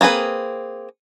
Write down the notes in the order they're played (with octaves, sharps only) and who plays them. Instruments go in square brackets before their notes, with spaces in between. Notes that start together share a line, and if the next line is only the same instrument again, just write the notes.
[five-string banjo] A#3 C4 G#4 B4